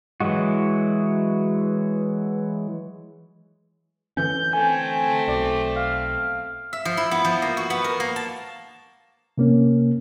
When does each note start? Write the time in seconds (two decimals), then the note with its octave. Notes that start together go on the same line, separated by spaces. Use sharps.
0.20 E3 F#3 G#3 F#4
4.17 D3 E3 C#4 G6
4.53 A3 C4 G#5
5.28 B1 D5
5.76 F5
6.73 E5
6.85 F3
6.97 E4
7.11 B3
7.25 F3
7.42 A#3
7.57 F#4
7.70 B3
7.84 A#4
8.00 A#3
8.16 A5
9.38 C3 A#3 C#4